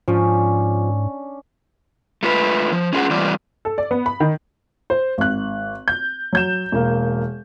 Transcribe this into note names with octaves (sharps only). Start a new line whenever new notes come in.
G#2 F3 C#4 D4
A3 F4 B4
F3
C#4 F4 G#4 F#5
E3 G3 C4 F4 D5
A4
D5
B3
B5
D#3
C5
G#1 F#6
G6
F#3 G6 E7
E1 A#3